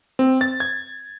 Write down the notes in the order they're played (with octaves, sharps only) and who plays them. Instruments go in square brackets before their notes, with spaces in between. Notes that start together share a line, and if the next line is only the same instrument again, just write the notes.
[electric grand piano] C4
A6
G#6